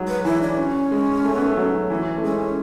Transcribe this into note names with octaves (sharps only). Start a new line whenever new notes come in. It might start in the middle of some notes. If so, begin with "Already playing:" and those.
Already playing: F#3 G#3
B4
E3 E4
D4
C#4
G#3
A3
B3
A3
F#3
E3 C#4
A3
G#3 C#4